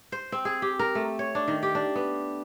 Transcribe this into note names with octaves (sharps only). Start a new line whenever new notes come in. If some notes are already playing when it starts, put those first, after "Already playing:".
C5
C4
G#4
G4
A#4
A3
C#5
D4
D#3
G4
D4
B3